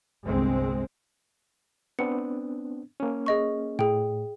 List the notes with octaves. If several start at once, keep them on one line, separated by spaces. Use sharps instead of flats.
G1 C2 G#3 C4
B3 C4 D4 C#7
A#3 C#4
G#4 D#5 C#6
A2 G#4 G5